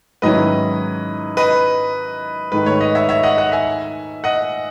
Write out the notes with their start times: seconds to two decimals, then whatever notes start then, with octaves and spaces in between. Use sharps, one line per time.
0.22 G#2 D#3 F#3 C#4 E4 B4 D#5
1.37 B4 D#5
2.52 G#2 D#3 A3 D#4 B4
2.66 C#5
2.80 B4 D#5
2.95 C#5 E5
3.09 C#5 E5
3.23 D#5 F#5
3.38 D#5 F#5
3.52 E5 G#5
4.24 D#5 F#5